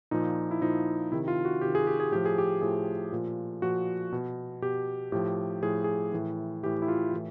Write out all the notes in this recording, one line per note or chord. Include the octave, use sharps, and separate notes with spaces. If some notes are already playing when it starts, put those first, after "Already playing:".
A#2 F3 D#4
E4
A#2 F3 D#4
C3 D#3 E4
F4
F#4
C3 D#3 G4
G#4
G4
G#4
A2 F3 G4
G#4
G4
A2 F3 G#4
A#2 F3
A#2 F3 F#4
B2
B2 G4
A2 F3 G4
A2 F3 G#4
G#4
A2 E3
A2 E3 G4
E4
F4
A2 E3